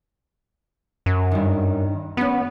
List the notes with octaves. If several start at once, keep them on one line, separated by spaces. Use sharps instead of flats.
F#2
G2 D#3
B3 C#4 B4